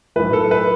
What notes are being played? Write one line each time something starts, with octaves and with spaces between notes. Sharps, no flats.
B1 A2 E3 B4
A4
B4